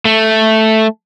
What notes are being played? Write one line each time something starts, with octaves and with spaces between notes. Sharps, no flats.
A3